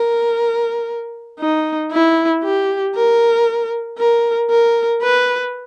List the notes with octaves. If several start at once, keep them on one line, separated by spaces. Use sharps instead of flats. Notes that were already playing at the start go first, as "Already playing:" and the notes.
Already playing: A#4
D#4
E4
G4
A#4
A#4
A#4
B4